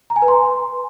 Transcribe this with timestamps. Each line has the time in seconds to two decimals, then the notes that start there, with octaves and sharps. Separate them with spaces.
0.10 A#5
0.16 G#5
0.22 B4
0.28 C6